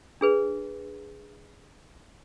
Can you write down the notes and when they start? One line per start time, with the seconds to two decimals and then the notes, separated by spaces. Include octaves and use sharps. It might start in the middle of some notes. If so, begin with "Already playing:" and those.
0.21 D4 G#4 B4